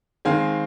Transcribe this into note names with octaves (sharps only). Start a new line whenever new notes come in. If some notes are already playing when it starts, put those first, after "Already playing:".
D#3 G#3 C4 F5 G#5